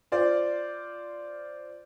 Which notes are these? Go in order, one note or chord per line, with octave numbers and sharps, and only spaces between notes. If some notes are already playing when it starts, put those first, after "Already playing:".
F4 C5 D5